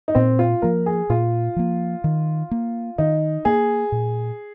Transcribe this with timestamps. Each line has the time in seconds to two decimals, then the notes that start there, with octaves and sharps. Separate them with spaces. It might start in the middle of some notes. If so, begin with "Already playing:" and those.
0.08 D#4
0.15 A#2 C4
0.39 F4
0.62 F3 A#3 A#4
0.86 G#4
1.10 A#2 F4
1.56 F3 A#3
2.04 D#3
2.51 A#3
2.98 D#3 D#4
3.45 A#3 G#4
3.92 A#2